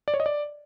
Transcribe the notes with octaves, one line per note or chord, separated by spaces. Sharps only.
D5
C#5
D#5
D5